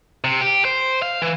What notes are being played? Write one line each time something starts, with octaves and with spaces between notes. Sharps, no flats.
C3
G4
C5
F5
E3